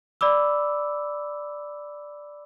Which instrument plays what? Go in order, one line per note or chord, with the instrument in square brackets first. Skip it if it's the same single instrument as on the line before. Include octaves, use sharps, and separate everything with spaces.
[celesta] D5 B5 D6 E6